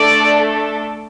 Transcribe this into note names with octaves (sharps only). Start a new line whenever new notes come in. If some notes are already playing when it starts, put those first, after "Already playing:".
Already playing: A3 D4 A4 D5